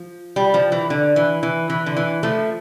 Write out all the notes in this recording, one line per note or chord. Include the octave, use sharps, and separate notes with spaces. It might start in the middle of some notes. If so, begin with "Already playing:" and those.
Already playing: F3
G3
F3
E3
D3
E3
E3
E3
D3
E3
F3 A3